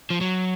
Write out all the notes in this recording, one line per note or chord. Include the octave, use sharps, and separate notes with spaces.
F3
F#3